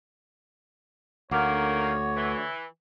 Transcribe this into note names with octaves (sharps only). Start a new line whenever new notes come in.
D2 D#3 A#3 C#5 F#5 D6
E3